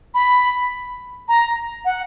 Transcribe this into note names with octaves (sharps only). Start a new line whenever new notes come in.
B5
A#5
F#5